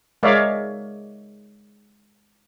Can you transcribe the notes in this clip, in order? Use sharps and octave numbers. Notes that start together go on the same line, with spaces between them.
G#3 A#4 C#5 D5 E5 F5